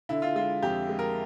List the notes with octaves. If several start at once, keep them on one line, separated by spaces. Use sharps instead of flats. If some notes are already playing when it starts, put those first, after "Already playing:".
D3 E4
F4
G#3 F4
F2 G4
G#3
A#4